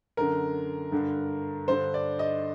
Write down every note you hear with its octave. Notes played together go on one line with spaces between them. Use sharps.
F#2 D3 A#4
G2 D3
G2 D3 C5
D5
D#5